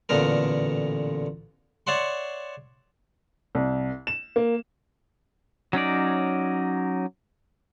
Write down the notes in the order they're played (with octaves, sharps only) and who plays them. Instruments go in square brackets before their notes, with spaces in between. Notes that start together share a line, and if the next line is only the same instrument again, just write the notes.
[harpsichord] A1 A#2 D3 B3 A#4
C#5 D5 E5 F#5 C6
[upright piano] C2
E7
A#3
[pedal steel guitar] F#3 C#4 D#4 D5